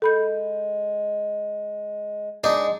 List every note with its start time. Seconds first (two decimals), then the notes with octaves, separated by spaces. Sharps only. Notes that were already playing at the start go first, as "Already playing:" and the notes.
0.02 G#3 A4 B5 G6
2.44 G#3 D4 D#4